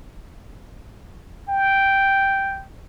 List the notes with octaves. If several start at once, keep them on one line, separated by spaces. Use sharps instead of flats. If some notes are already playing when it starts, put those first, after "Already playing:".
G5